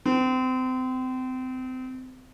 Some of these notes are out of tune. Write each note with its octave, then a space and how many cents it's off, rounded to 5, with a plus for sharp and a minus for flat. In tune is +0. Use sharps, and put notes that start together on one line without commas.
C4 -30